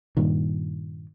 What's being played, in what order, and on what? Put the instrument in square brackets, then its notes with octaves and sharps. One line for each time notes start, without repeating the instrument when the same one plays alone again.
[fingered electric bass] G2 A#2 D#3